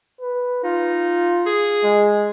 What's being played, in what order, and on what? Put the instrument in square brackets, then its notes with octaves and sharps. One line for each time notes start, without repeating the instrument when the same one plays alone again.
[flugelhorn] B4
[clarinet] D#4 [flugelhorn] F4
[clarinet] G#4
[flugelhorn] G#3